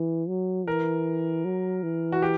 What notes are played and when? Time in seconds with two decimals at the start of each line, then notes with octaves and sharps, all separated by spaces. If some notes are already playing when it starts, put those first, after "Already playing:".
Already playing: E3
0.28 F#3
0.67 E3 A#4
1.45 F#3
1.83 E3
2.12 F#4
2.22 G4